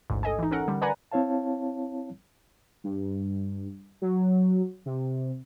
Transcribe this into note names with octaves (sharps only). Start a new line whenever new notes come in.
A1 D2 G#2
A4 D#5 G#5
E3 D#4
C#4 A4 A#4 F#5
D3 G3
B4 D5 F#5 G#5 A#5 B5
C4 E4 C#5 F5 A5
G2
F#3
C3